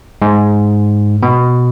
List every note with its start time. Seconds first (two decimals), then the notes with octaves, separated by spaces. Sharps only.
0.22 G#2
1.23 B2